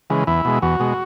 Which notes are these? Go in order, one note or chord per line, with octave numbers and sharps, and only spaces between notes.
C#3 E3 G#3
E2 E4
B2 G#3
E2 F#4
B2 G#3